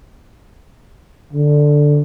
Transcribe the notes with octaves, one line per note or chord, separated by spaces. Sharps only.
D3